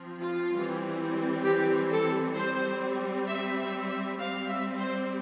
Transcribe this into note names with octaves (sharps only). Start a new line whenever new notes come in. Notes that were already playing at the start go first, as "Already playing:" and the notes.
Already playing: F3 C4
F4
E3 G3 C4
G4
A4
G3 C4 C5
E5
E5
E5
G3 C4 F5
E5
C5